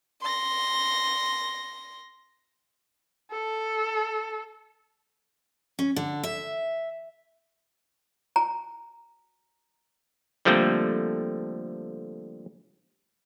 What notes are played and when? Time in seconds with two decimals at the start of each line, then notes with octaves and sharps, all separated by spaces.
0.22 C6 A#6
3.32 A4
5.79 C#4
5.96 D3
6.23 E5
8.36 A#5
10.45 D3 F3 G3 A3 A#3 C4